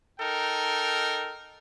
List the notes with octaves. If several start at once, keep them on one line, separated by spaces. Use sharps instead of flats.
D#4 A4 A#4 G5